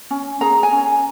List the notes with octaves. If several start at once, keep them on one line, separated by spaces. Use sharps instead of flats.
C#4
G#4 A#5
G#5
C#4